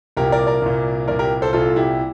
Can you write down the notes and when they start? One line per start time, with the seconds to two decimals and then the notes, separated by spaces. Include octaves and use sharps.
0.17 C2 A#2 G4 A#4
0.32 A#4 D5
0.47 A#4 D5
0.62 C2 A#2
1.08 C2 A#2 A#4 D5
1.19 G4 A#4
1.42 A4 C5
1.53 C2 A#2 F4 A4
1.76 E4 G4